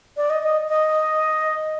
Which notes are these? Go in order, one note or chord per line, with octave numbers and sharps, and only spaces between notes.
D5
D#5
D#5
D#5